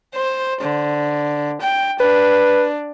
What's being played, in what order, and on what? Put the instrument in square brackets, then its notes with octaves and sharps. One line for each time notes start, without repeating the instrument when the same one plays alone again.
[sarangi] C5
D3
G5
[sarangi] D4 [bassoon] B4